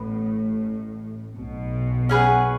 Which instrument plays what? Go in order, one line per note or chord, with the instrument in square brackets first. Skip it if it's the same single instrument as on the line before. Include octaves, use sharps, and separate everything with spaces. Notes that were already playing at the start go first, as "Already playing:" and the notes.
Already playing: [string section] A1 A2 [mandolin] B3
[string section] B1 B2
[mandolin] C#4 G#4 B4 F#5